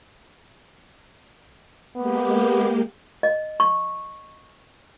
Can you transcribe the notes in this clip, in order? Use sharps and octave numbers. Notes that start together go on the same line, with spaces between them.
G#3 A#3 B3 G4
D#5
C#6